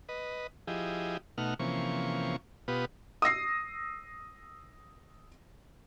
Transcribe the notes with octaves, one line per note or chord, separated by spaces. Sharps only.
B4 D#5
F3 E4 G4 G#4 D#5
B2 A3 D#4 F#5 F6
C3 E3 F3 A#3 C#4 C#6
B2 B3 F4 G4 B4 D#6
D#6 E6 A#6 C7